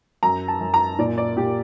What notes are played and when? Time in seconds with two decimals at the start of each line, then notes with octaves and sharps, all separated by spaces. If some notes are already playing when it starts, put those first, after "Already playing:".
0.23 F#2 A#5
0.48 A5
0.61 F#2
0.74 A#5
0.98 A#2 D5
1.18 D5
1.37 A#2 G4